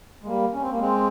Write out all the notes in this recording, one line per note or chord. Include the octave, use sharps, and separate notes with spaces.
G#3
G3 A#3
C#4
C4
A#3
G#3 C4